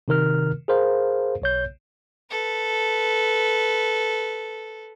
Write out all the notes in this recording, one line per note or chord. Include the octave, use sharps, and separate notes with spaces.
C3 D#3 A#4 F6
G#4 A#4 C5 F5
B1 C#5 G6
A4 B4